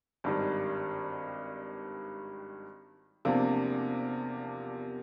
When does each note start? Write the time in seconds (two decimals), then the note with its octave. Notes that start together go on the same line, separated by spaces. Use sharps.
0.24 G#1 G2 D#3 G3
3.25 E2 C3 F3 A#3 D4